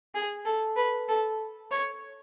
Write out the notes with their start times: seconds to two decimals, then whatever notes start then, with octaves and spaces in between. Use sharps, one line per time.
0.15 G#4
0.45 A4
0.76 B4
1.08 A4
1.71 C#5